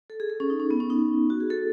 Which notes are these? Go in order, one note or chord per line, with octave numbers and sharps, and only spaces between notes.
A4
G#4
A4
C#4
D#4
C#4
B3
C#4
D#4
F#4
G#4
A4